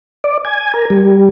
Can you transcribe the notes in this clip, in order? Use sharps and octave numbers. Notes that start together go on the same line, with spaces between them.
D5
G#5
A#4
G3